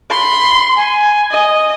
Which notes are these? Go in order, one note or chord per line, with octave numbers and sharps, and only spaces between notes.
B5 C6
G#5
D#5